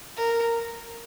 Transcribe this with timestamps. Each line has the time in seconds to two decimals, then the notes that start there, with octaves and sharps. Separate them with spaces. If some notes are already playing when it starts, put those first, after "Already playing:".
0.17 A#4